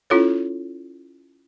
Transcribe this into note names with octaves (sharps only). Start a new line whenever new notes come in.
C#4 E4 F4 A4 C#5